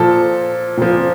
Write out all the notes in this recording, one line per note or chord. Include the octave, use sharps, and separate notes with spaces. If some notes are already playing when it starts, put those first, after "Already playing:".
Already playing: A#2 F3 A4
A#2 F3